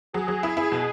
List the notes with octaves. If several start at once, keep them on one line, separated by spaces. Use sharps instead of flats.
F#3 G#4
F#3
E4
E4 G#4
B2